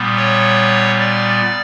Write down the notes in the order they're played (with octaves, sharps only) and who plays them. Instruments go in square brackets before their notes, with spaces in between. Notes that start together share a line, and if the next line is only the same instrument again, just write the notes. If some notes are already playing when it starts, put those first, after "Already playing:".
Already playing: [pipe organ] A#2 G3 B3
C#5
D5